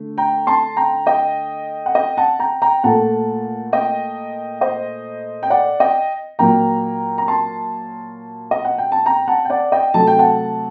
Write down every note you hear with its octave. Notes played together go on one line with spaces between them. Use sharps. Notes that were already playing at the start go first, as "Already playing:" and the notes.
Already playing: D3 A3
G5 A#5
A5 C6
G5 A#5
D#5 G5
F#5
D#5 G5
F#5 A5
G5 A#5
G5 A#5
A#2 A3 F#5 A5
D#5 G5
C5 D#5
G5
D5 F#5
D#5 G5
A#2 F#3 A#3 G5 A#5
A#5
A5 C6
D#5
F#5
G5
A5
G5 A#5
F#5 A5
G5
D5 F#5
D#5 G5
C3 F#3 A3 A5
G5
F#5 A5